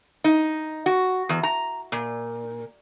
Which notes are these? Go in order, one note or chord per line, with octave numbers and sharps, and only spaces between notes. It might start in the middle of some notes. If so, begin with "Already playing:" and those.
D#4
F#4
E2
A#5
A#2